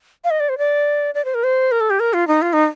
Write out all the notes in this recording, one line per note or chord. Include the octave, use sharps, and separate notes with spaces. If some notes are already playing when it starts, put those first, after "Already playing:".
F5
D#5
D5
C5
D5
D5
C5
A#4
C5
A#4
A4
G4
A#4
F4
D#4
F4
D#4